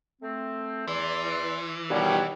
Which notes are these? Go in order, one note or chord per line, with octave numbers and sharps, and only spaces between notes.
A3 C4
E2 E3 D5 C6
B2 D#3 G3 F4 B4 C#5